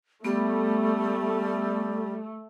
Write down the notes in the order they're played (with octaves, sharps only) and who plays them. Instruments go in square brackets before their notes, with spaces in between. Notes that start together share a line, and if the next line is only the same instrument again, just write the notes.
[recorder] G3 [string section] A3 [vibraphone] B3